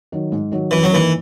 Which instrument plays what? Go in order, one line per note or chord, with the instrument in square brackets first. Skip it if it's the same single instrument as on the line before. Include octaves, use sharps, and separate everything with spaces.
[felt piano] D#3 F#3
G#2
D#3 F#3
[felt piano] F#2 [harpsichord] E3
[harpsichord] F#3
[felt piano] D#3 A#3 [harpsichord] E3